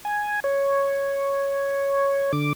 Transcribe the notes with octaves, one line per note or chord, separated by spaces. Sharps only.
G#5
C#5
D3 D6